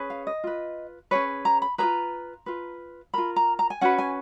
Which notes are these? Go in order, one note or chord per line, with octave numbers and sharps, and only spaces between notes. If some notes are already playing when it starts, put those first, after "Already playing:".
Already playing: C#4 G#4 B4
F5
D#5
F4 B4
C#4 G#4 B4 C#5
A#5
B5
F4 G#4 B4 A#5
F4 B4
F4 A#4 B5
A#5
A#5
G#5
C#4 F#4 B4 F#5
G#5